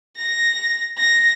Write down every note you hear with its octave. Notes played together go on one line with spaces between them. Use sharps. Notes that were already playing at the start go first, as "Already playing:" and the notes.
A#6
A#6